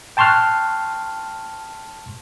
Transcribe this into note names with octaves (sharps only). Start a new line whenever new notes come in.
G5 A5 C6 C#6 F6 F#6